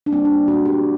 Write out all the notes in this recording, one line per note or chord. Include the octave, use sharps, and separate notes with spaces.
D4
A#2 G3 A#3 C4
D4
A#2 G3 A#3 F#4
G4